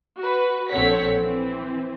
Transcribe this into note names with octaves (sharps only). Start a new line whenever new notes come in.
F#4 B4
A#1 C4 A4 C#5 F#5 B6
E3 C4